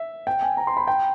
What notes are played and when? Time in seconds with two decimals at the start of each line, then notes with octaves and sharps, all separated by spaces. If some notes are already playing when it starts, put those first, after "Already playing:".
Already playing: E5
0.27 G5
0.42 G#5
0.57 A#5
0.67 C6
0.77 B5
0.87 G5